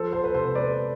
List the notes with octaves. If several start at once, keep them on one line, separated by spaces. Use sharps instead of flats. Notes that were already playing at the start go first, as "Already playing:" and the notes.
Already playing: F3 A4 C5
A4 C5
B4
C3 A4 C5
B4 D5